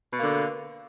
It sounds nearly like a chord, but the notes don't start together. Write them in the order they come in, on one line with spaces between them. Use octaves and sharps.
B2 A#3 D3